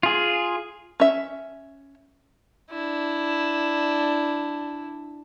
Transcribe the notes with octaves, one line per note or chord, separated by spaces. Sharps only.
F4 G#4
C#4 E5
D4 E4